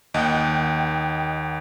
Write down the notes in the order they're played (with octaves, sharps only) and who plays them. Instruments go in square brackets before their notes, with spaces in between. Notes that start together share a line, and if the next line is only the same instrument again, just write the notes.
[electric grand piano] D#2 [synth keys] D#5 F#5 G5